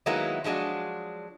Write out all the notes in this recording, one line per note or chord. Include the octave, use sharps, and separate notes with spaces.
D#3 F#3 G#3 A#3 B3 E4
F3 F#3 G#3 D4 F#4